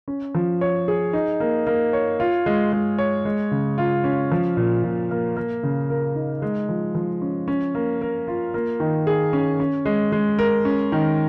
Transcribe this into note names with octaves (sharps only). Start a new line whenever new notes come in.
C#4
F3
C#5
G#4
D#4
A#3
A#3
C#5
F4
G#3
G#3
C#5
G#3
C#3
F4
C#4
F3
A#2
A#2
A#3
A#3
C#3
A#4
D#4
G#3
F3
F3
C#4
C#4
A#3
A#4
F4
A#3
D#3
G#4
C#4
C#4
G#3
G#3
A#4
C#4
D#3